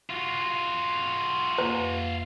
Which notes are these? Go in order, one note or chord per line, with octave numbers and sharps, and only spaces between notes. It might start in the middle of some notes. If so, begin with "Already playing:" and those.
F4 F#4
F2 A#3 B4